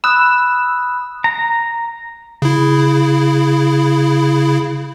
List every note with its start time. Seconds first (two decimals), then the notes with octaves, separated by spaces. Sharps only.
0.04 B5 D#6 E6 F#6
1.24 A#5
2.42 C#3 E4